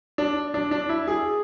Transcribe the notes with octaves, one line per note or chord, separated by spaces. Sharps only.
D4
D4
D4
E4
G#4